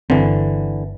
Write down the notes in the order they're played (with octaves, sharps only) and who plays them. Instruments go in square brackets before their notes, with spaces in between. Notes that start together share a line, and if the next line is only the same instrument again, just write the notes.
[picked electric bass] G1 C4 [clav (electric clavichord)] D3 E3